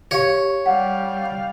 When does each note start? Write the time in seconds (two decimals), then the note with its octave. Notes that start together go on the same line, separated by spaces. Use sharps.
0.11 G4 C#5 F5
0.66 G3 F5 F#5